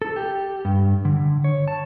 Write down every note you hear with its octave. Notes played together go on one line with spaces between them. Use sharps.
A4
G4
G2
D3
C#5
A5